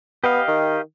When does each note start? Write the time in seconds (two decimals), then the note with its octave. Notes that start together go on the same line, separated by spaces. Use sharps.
0.24 B3 G4 D#5 F5
0.48 D#3